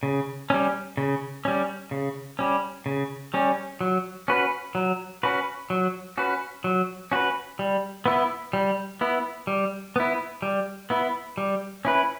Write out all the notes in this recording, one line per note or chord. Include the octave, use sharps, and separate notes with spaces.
C#3
G3 C#4
C#3
G3 C#4
C#3
G3 C#4
C#3
G3 C#4
F#3
C#4 F#4 B4
F#3
C#4 F#4 B4
F#3
C#4 F#4 B4
F#3
C#4 F#4 B4
G3
B3 E4
G3
B3 E4
G3
B3 E4
G3
B3 E4
G3
C#4 E4 B4